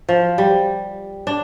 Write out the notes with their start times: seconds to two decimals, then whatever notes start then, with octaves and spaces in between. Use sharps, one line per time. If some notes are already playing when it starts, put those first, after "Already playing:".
0.09 F3
0.38 G3
1.27 D4